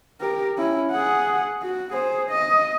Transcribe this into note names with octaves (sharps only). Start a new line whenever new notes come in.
G4 A#4
C#4 E4
G#4 F#5
F#4
G#4 C5
D#5